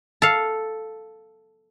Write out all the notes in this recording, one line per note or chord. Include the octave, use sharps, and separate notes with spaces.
A4 F5